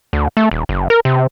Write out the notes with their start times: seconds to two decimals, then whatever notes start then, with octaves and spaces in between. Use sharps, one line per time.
0.13 D2
0.37 A3
0.51 D#1
0.69 F#1
0.90 A#4
1.05 C3